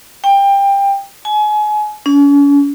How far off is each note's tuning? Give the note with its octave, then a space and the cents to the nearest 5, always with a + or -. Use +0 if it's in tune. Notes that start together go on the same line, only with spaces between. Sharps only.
G5 +20
G#5 +30
C#4 +40